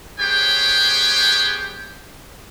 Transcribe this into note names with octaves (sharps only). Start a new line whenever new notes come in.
B3 G4 G#4 C5 C#5 G5